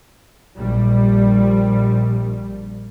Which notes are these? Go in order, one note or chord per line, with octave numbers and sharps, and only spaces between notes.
A#1 G3